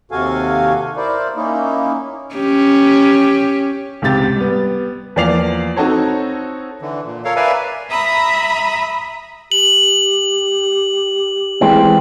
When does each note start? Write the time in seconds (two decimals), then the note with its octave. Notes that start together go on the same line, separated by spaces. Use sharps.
0.11 D#2 C3 F#4 A4 F5 G#5
0.97 E4 A#4 C5 D5
1.36 A#3 C#4 D#4 E4
2.35 C#4 G4
4.02 C#2 G#2 C3 G4 A6
4.36 G3 B3
5.16 E2 F3 A#3 D5 C7 F7
5.76 C4 D#4 F#4 A4 C#5
6.81 D3 E3
7.05 A#2
7.25 A4 A#4 C#5 F5
7.36 A#4 B4 D5 E5 F5 G#5
7.89 E5 A#5 B5 D#6
9.52 G4 F#7
11.61 E3 G#3 C4